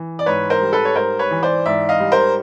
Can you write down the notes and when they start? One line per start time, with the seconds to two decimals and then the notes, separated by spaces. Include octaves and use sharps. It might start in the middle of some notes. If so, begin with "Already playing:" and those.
Already playing: E3
0.19 D5
0.26 G#2 B4 C#5
0.50 A#4 C5
0.61 G3
0.73 A4 B4
0.85 C#5
0.96 G#2 A#4 C5
1.19 B4 C#5
1.31 E3
1.42 C5 D5
1.66 G#2 D5 E5
1.89 D#5 F5
2.00 G3
2.12 A#4 C5